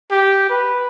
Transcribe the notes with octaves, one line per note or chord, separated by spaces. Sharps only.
G4
B4